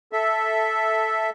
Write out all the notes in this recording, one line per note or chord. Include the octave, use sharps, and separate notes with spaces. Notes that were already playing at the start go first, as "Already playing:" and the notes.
A4 E5